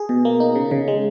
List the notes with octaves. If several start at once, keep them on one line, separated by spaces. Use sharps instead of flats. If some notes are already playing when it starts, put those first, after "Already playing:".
Already playing: G#4
B2
A#3
D#4
C#3
C#3
G#3